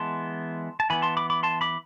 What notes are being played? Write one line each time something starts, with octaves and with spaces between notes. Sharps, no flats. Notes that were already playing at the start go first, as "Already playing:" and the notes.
Already playing: E3 G#3 B3 A5 C6
A5
E3 B3 G#5 B5
A5 C6
B5 D6
B5 D6
A5 C6
B5 D6